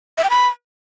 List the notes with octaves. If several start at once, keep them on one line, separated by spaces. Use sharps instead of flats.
E5
G5
B5